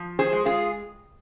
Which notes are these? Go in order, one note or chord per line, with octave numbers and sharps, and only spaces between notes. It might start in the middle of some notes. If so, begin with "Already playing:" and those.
Already playing: F3
G#4 C5
G#3
F4 G#4